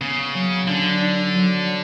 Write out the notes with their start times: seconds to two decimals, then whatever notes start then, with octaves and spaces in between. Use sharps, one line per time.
0.01 C#3 B3
0.34 F#3
0.68 D3 D4
1.02 D4
1.34 F#3
1.67 F#3